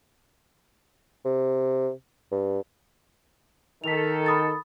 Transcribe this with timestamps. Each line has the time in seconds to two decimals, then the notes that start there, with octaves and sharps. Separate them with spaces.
1.25 C3
2.32 G2
3.84 D#3 A4 B6 F7
4.26 B5 D#6 A6